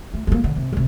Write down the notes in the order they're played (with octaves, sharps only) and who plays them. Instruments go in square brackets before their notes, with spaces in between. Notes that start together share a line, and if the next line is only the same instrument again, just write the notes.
[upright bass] A3
A#3 B3
D3
C3
F#1 C3